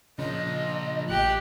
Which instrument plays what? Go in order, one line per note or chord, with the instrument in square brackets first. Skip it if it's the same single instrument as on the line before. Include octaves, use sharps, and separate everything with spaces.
[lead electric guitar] A#2 F3 [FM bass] C#3 [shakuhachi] D#5
[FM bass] A1 [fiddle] G4 F#6